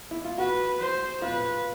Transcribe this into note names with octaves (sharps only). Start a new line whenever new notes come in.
E4
F4
F#4 B4
C5
F4 B4